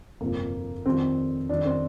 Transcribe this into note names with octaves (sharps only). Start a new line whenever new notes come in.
G1 F2 C3 A#3
F2 D#3 G3 C4
F2 D#3 G3 D4
C4